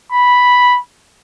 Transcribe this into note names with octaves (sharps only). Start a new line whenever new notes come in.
B5